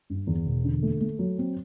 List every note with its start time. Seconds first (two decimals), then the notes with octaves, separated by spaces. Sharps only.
0.10 G2
0.27 E2
0.46 E1
0.65 D3
0.83 A3
1.01 A3
1.19 F#3
1.38 C4